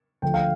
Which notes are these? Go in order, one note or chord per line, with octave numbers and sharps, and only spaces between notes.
D2 D3 F3 A3 G5
F5